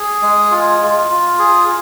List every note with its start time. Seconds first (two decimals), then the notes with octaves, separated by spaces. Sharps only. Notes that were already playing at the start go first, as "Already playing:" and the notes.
Already playing: G#4
0.22 G#3
0.51 F4
0.80 F4
1.10 F4
1.39 G#4